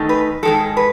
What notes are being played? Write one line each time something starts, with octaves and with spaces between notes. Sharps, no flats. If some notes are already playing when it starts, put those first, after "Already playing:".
Already playing: E2 D#3 A3 D#4
B4
G#2 D#3 G#3 A4
B4